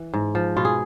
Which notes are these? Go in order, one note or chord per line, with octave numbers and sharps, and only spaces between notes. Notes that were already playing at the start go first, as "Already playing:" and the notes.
Already playing: E3
G#2
F3
B2 F4
G#4